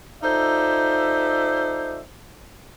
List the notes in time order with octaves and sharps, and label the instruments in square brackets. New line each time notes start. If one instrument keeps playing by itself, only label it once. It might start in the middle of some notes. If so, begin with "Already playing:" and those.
[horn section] D#4 F4 A4 C5 D5 E5